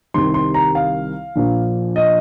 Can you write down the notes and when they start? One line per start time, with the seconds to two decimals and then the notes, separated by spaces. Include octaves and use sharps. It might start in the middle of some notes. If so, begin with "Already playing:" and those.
0.14 C2 C3 D#3 G3 C6
0.34 C6
0.54 A#5
0.75 F5
1.36 A#1 A#2 F3
1.96 D#5